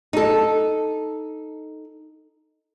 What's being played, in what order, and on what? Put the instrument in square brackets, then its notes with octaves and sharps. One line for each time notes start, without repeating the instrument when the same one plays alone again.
[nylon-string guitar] D#4 A4